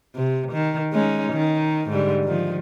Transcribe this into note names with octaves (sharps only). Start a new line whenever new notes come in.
C3
D#3
G#3 C#4 D#4
D#3 D#4
G#2 D3 G3
D#3 F3